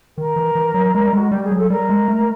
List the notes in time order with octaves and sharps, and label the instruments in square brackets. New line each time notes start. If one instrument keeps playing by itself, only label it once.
[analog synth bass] D#3 [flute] A#4
[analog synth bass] E3
E3
F#3
G#3
G3
[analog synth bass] G#3 [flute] F#4
[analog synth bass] G3 [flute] G4
[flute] G#4
[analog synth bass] F#3
[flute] A4
[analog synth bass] G3 [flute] A#4
[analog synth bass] G#3
A3